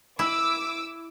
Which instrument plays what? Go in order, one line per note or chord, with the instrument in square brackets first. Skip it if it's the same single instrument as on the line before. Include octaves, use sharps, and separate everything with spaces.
[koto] E4 [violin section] D6 E6